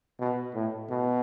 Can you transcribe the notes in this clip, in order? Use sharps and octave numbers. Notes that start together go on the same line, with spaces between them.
B2
A2
B2